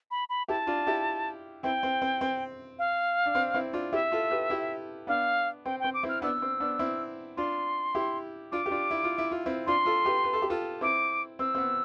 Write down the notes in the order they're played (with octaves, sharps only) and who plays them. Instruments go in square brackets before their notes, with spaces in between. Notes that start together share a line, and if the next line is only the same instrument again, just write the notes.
[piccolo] B5
B5
[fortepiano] E4 G4 [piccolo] A5
[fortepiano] D4 F4
E4 G4
[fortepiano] C4 E4 [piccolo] G5
[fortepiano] C4
C4
C4
[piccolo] F5
[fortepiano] D4
C4
C4 E4
D4 F4
[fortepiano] E4 G4 [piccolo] E5
[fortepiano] F4 A4
G4 B4
E4 G4
[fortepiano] B3 D4 [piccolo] F5
[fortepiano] C4 [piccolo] G5
[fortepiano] C4 [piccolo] G5
[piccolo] D6
[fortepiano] C4 E4
[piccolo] F6
[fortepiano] B3 D4 [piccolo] E6
[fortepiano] C4
B3 D4
C4 E4
[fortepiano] D4 F4 [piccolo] C6
[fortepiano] E4 G4
[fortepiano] D4 F4 [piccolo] D6
[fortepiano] G4
D4 F4
E4
F4
E4
F4
C4 E4
[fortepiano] D4 F4 [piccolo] C6
[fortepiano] F4 A4
G4 B4
B4
A4
G4
F4 A4
[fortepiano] C4 E4 [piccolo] D6
[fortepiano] C4 [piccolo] E6
[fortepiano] C4
B3